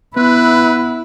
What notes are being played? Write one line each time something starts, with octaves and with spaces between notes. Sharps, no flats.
B3 E4 B4 F#6